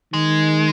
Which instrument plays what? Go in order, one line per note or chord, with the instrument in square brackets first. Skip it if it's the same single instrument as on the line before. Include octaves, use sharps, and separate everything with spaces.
[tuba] D#3 [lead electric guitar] G#3